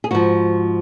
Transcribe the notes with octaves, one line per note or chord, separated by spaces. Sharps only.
G#4
G#2 F3 F#4